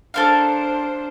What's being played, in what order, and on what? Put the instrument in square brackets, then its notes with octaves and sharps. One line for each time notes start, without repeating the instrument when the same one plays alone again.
[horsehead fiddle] D4 C5 [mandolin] A4 A#4 F5